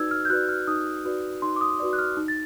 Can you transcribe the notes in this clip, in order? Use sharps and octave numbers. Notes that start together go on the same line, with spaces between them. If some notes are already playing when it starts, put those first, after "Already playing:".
Already playing: D#4 F#4 B4 D5 E6 G#6
F6
G6
F#4 B4 D5 F#6
F6
D#4 D#6
F#4 B4 D5
D#4 C6
D6
D#6
F#4 B4 D5
F#6
F6
D#4
A6